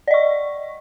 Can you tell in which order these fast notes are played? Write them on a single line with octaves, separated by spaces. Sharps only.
D5 D#5 C#6